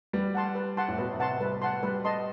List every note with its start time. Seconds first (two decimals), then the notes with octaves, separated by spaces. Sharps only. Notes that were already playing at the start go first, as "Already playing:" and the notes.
0.13 G3 B4
0.35 F#5 A5 C6
0.55 B4
0.77 F#5 A5 C6
0.88 A2
0.98 B2 B4
1.13 C3
1.20 F#5 A5 C6
1.41 G3 B4
1.62 F#5 A5 C6
1.83 G3 B4
2.05 D#5 A5 C6